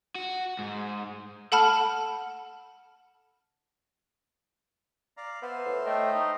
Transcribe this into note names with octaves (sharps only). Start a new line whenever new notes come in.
F#4
G#2
A4 F#5 A5 B5 F6
D5 F5 A#5
B3 C5 E5 F5
A2
A3 D#5 G5
D#4